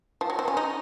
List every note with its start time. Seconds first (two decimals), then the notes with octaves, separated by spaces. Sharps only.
0.21 F3
0.30 F#3
0.39 C4
0.48 C#4
0.57 D#4